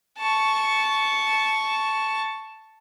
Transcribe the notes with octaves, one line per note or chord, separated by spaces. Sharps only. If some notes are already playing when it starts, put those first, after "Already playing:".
A5 C#6